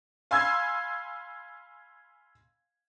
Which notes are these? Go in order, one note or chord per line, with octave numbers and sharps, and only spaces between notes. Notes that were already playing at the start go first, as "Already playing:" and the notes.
F5 G#5 B5 C6 E6 G#6